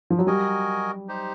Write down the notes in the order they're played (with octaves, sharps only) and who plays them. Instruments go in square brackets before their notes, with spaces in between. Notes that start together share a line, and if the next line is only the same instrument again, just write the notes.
[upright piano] F3
F#3
[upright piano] G3 [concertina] F#4 A#4 D#5 G#5
[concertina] D#4 G4 C5